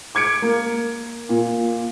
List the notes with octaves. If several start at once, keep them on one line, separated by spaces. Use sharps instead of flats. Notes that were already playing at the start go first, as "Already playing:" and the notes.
D6 G#6 C#7 D7
A#3
A#2